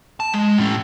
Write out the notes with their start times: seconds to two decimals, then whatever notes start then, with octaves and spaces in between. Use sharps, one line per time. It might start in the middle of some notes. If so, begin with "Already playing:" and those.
0.20 A5
0.34 G#3
0.58 A2 C#4